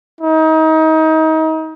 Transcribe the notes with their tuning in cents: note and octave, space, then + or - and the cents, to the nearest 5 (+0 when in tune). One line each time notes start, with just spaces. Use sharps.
D#4 +30